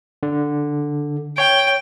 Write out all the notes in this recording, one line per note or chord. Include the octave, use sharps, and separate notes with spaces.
D3
C#5 G5